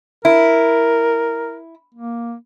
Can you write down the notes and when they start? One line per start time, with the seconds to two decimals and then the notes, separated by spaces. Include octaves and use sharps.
0.25 E4 A#4
1.95 A#3